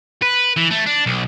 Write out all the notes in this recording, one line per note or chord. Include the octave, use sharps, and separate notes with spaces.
B4
E3
A3
D4
B1